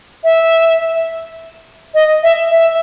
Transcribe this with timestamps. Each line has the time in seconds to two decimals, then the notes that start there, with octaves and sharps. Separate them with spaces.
0.24 E5
1.94 D#5
2.23 E5
2.51 E5